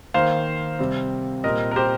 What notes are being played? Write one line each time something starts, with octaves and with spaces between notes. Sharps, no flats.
D#3 A#3 C5 F5
C3 G3 C4
A#2 G3 C4 A#4 D#5
A#4
G4 C5